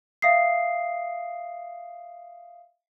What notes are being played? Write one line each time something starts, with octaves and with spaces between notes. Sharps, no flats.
E5 F5 D#6 C7